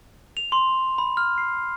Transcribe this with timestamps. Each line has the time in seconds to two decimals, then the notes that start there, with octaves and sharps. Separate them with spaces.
0.37 F7
0.52 C6
0.98 B5
1.17 F6
1.38 C7